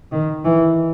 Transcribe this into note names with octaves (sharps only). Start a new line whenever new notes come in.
D#3
E3